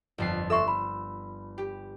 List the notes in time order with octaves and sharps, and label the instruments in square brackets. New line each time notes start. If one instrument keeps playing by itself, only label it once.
[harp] G1 F2 C7
[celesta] A4 E5 C#6 [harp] C6 E6
[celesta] B5
[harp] G4